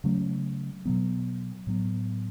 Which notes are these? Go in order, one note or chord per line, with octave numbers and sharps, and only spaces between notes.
C#3 F#3 A3 C#4
B2 F#3 B3
A2 F#3 B3